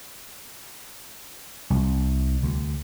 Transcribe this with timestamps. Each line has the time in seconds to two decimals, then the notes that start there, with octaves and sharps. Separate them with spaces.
1.70 C2
2.43 D2